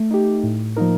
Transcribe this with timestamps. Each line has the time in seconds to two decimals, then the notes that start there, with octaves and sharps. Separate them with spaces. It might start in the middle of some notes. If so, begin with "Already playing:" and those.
Already playing: A3
0.11 D#4 G4
0.43 A2
0.76 F3 A#3 D#4 A#4